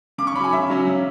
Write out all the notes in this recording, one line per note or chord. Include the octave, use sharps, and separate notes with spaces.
C#3 D6
C#6
F#3 C#4 G#5 B5
C#3 E5
F#3 C#4
C#3